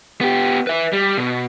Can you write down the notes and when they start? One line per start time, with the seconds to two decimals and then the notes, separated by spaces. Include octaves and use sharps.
0.21 B3 G4
0.67 B4 E5
0.93 G3
1.18 B2